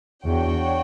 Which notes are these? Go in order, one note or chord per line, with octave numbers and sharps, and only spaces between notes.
E2 D4 F#4 C#5 G5